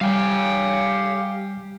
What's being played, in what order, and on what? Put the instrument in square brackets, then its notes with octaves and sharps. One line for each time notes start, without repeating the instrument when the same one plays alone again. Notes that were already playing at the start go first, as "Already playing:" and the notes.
[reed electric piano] G3 [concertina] G4 [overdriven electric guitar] F5 G#5